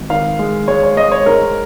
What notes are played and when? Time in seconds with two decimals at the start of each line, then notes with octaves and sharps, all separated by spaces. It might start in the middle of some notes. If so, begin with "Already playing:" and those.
Already playing: G#1
0.10 D#3 F5
0.39 G#3
0.68 G#3 C#5
0.83 C#5
0.97 G#3 D#5
1.12 C#5
1.26 G#2 A#4